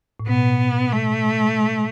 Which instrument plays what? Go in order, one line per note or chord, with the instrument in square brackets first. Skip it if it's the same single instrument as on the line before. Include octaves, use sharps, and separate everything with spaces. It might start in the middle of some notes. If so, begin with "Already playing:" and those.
[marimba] A2
[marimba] B2 [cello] B3
[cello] A3